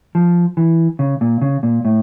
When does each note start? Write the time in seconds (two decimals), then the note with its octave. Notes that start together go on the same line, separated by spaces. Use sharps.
0.15 F3
0.57 E3
0.99 C#3
1.21 A#2
1.42 C#3
1.63 A#2
1.85 A2